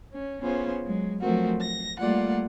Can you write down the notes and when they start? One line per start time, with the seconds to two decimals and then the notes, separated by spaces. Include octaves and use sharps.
0.11 C#4
0.41 B3 C#4 F4 G#4 C5
0.85 F#3 G#3
1.20 F3 F#3 A3 C4 F#4 A#4
1.60 A#6
1.99 G3 A3 A#3 F4 D5 F#5